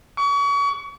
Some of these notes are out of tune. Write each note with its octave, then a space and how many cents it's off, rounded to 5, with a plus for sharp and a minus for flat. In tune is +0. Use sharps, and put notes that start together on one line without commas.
C#6 +35